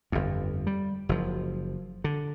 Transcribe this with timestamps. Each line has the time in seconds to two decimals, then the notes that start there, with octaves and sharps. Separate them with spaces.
0.12 G1 F2
0.67 G3
1.09 F#1 F3
2.04 D3